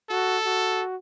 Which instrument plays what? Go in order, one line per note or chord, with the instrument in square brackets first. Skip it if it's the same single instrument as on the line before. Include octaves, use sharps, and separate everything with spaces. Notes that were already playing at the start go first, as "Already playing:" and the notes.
[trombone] F#4 [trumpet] A4
[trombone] F#4